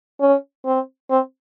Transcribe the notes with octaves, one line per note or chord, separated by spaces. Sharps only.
C#4
C4
C4